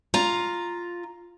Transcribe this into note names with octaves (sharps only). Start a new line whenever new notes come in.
F4 A#5